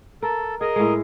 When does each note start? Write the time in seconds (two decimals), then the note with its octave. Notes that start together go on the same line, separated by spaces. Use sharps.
0.22 A4 A#4
0.61 G#4 A#4 D#5
0.76 A2 G#3